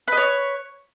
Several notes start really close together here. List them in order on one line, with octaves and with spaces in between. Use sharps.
B4 D#5 C#5